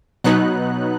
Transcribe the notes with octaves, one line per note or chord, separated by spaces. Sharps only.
B2 F#3 B3 D#4 F#6